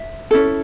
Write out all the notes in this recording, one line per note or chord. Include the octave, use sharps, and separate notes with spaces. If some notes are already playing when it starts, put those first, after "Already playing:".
Already playing: E5
C#4 E4 A4